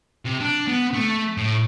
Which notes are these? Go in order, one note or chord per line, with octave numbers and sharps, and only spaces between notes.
C3
D4
B3
A3
A2